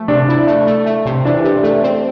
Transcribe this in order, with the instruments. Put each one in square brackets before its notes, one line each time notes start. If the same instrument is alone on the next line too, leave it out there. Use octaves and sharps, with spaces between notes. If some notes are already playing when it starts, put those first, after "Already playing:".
Already playing: [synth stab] F3 A3
[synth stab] C3 [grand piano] D4
[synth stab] E4
A3
A3
A3
C3
[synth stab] E3 [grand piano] D4
[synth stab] C3
A3
C4